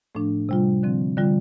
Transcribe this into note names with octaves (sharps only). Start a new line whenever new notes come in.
A2 F3 A3 D4
C3 G3 F4
D3 F3 C4
D3 G3 F4